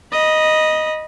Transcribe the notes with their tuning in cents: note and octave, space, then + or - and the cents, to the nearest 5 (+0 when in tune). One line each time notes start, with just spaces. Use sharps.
D#5 +0 B5 -30